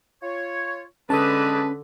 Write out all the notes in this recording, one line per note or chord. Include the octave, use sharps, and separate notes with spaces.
F4 C#5
D3 G#3 C#4 B4 A5 D#6